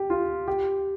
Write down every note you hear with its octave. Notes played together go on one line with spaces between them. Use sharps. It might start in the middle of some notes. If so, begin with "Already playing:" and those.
Already playing: G4
F4
G4